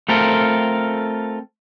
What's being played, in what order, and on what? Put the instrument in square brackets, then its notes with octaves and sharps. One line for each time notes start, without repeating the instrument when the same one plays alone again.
[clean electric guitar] A3 C4 F4 A4 A#4